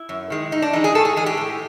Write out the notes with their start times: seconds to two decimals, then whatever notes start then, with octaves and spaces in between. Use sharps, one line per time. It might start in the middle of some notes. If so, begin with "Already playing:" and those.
Already playing: E4
0.09 F#2
0.30 D#3 G#3
0.51 A2 D#4
0.62 D4
0.73 E3 G#3 D#4
0.84 G#4
0.95 A2 A4
1.05 G#4
1.16 E3 G#3 G#4
1.26 G4
1.37 A2